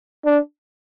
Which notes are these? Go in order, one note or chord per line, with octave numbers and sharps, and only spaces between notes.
D4